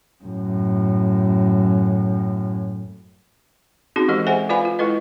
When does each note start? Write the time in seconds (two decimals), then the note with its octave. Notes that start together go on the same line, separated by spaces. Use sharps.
0.24 F#2 A2
3.96 C4 C#4 D#4 F#4 G#4
4.08 E3 G#3 G4 A#4 D#5
4.27 G#4 A4 C5 E5 F#5 G#5
4.49 F4 B4 D5 F5 G#5 B5
4.65 F4
4.79 G#3 E4 A4 B4 D#5